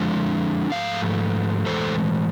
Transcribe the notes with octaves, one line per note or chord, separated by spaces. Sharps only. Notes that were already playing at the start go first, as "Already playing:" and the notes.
Already playing: D3 F3 G#3 D4
G#2 F3 A3 F5
A2 E3 G#3 A4 C5